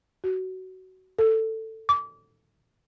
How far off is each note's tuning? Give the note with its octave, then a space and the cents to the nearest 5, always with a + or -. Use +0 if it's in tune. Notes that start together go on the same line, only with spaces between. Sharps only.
F#4 +20
A4 +10
D6 -30